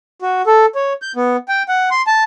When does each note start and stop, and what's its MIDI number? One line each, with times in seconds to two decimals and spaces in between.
0.22 0.42 66
0.47 0.66 69
0.75 0.93 73
1.02 1.12 91
1.16 1.37 59
1.48 1.63 79
1.68 1.89 78
1.91 2.02 84
2.07 2.24 81